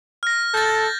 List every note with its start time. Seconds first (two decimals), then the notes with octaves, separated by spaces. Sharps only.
0.23 F6 A#6
0.54 A4 G6 A6